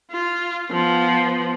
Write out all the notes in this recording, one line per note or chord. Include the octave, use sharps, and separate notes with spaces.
F4
F3 B3